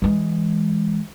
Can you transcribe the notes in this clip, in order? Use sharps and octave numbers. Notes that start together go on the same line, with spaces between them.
E3 G#3